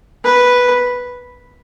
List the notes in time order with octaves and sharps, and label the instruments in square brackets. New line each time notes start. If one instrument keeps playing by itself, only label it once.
[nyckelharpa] B4